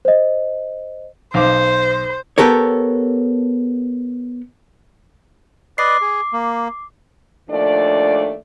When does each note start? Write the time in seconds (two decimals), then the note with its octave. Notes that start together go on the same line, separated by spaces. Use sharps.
0.05 C5 D#5
1.34 B1 C5 F5 D6
2.38 B3 G4 A4 A#4 C#5
5.78 B4 D5 D#5 D6 C7
6.01 G#4
6.33 A#3
7.50 D#2 F3 A3 D4 D5